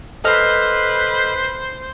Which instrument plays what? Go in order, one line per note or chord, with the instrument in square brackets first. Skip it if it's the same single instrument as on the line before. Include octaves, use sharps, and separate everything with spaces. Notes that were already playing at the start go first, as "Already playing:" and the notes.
[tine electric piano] A4 D#5 F6 [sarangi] B4 [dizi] C5